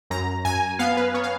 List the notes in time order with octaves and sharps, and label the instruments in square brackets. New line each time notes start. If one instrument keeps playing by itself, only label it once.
[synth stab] F#2 A#5
F#2 G#5
B3 F5
B4
B3 C#5
F5